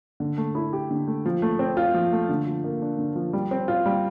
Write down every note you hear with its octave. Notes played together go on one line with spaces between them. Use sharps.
D3
A3
E4
G4
D3
A3
F3
A3
C4
F4
F3
A3
D3
F3
A#3
D4
D3
F3
G3
C4
F4
G3